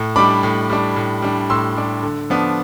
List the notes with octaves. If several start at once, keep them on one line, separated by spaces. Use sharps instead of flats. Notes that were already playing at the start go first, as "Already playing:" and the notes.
Already playing: A2
G3 D4 B5 D6
A2
G3 D4
A2
G3 D4
A2 C6 E6
G3 D4
D3
F3 B3 D4